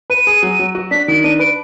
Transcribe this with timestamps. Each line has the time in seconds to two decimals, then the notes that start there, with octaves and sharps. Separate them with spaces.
0.10 B4 D#7
0.27 G#4
0.43 F#3
0.60 F#3
0.75 F#4
0.91 D4 B6
1.08 D#3 D7
1.24 D4 D#7
1.39 B4 D7